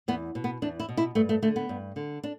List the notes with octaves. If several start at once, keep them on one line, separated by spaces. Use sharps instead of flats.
E2 B3
B2
B3
E2 D4
E4
B2
E4
G2 A3
A3
D3 A3
B3
G2
D3
D4